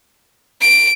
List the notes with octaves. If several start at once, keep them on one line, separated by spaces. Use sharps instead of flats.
D7